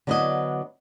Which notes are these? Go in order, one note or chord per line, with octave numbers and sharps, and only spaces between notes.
D3 F#3 B3 D4 E4 D#5